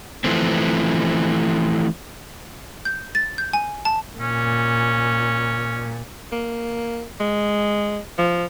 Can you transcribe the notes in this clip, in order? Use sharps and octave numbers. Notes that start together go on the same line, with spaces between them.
E3 F3 A3 C4
G6
A6
G6
G#5
A5
A#2 C#4
A#3
G#3
F3